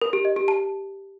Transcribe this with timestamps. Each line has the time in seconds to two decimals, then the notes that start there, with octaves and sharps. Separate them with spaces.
0.02 A#4
0.13 G4
0.25 D#5
0.36 G4
0.48 A5